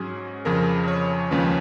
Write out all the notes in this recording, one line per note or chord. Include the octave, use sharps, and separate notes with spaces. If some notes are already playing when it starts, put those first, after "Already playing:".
Already playing: G#2 F#3 C#4 G#4
F2 C#3 F3 A#4
C#5
D#2 C#3 F3 G#3 C#4 B4